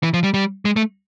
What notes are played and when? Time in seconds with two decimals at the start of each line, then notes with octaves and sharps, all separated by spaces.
0.03 E3
0.14 F3
0.24 G3
0.34 G3
0.65 G#3
0.76 A3